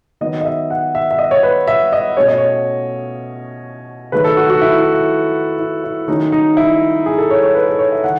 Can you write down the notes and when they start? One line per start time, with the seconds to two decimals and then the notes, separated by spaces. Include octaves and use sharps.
0.21 D#3 F#3 B3 D#5
0.41 D#5
0.45 E5
0.70 F#5
0.95 E5
1.11 E5
1.19 D#5
1.31 C#5
1.43 B4
1.68 E5
1.92 D#5
2.17 B2 A3 C#4 C#5
2.28 D#5
2.38 C#5
4.12 D#3 F#3 A3 B4
4.24 A4
4.37 F#4
4.50 F#4
4.62 E4
4.78 E4
4.94 E4
5.59 E4
5.84 E4
6.08 D#3 F#3 A3 C#4 D#4
6.32 D#4
6.57 E4
7.06 G#4
7.18 A4
7.30 C#5
7.43 C#5
7.55 B4
7.67 A4
7.79 C#5
7.92 E5
8.04 D#3 F#5